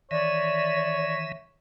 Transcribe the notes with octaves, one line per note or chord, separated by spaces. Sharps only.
D#3 E3 C#5 D5 E5